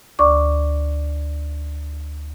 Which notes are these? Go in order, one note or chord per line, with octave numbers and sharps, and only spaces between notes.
D2 D5 C#6 D6